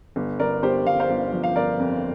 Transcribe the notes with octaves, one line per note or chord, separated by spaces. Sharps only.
G1
G1 A#4 D5
G1 G4 C5
G1 F5
C5 F5
G1
F3
F5
G1 A#4 D5
F2